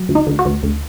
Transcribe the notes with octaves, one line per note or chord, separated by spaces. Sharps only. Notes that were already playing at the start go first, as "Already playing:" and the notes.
Already playing: F#3
D2
D#4
D2
F#4
D2
D2